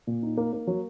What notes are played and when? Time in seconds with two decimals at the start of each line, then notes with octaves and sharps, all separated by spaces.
0.07 A#2
0.23 D#4
0.37 A#3
0.53 A#3
0.67 F#3